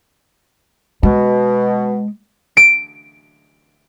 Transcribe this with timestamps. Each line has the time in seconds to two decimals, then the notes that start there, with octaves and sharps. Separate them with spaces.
1.03 B2 G#3
2.57 D7